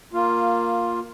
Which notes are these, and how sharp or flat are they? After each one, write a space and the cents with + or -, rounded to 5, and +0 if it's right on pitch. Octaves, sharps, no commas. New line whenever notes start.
A#3 +0 F4 +10 F5 -10